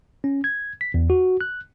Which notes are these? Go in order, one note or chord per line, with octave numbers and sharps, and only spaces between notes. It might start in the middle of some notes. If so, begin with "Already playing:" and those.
C#4
G#6
B6
E2
F#4
F#6